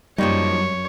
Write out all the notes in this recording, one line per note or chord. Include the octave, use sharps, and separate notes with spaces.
F#2 F3 G3 A#3 D#4 C#5